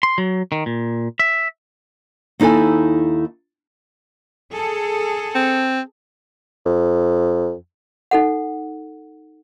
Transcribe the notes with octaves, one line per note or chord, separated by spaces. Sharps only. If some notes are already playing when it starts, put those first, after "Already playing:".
C6
F#3
D#3
A#2
E5
D#2 D#4 E4 A4 G#5
G#4 A4
C4
F2
D#4 A4 F#5